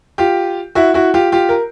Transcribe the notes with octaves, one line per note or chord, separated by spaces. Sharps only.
F4 G4
E4 F#4
E4 F#4
F4 G4
F4 G4
A#4